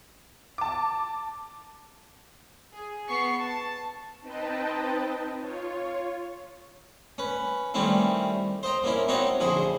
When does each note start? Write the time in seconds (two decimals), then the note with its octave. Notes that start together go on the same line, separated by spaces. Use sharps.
0.58 A5 D6
2.74 G#4
3.08 B3 F#5 C#6 C7
3.38 A5
4.21 C4 D#4 B4 D#5 G5 A5
5.39 F4 C#5
7.18 C#4 B4
7.74 D#3 G3 A3 C4 C#4 E4
8.63 C5 D#5 G5 A#5
8.83 A#2 A#3 C#4 E4
9.08 C4 D#4 F#4 C#5 D#5 E5
9.40 A#1 D3 E4 G#4 C5